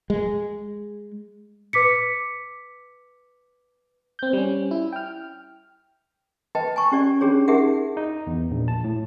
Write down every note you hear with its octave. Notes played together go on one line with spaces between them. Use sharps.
G#3
B4 D6 B6 C#7
C4 G6
G3 C#4
E4
G5 F6
B4 D#5 G5 A5
G#5 A5 C#6
C#4 G4 D5
C#4 D4 G4 G#4 C#5
D#4 G4 G#4 A#4 E5 F#5
D#4
E2
A#1
A5
A2